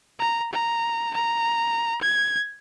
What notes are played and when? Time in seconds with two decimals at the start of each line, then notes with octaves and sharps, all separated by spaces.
0.19 A#5
0.52 A#5
1.14 A#5
2.02 G#6